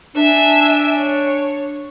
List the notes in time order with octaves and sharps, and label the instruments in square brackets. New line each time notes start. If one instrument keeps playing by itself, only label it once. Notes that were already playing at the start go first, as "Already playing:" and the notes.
[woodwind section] D4 [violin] E5 G#5
[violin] C#5